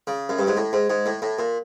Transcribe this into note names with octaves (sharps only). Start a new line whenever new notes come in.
C#3
F#2
G2
G#2
A2
G#2
G#2
A2
A2
A#2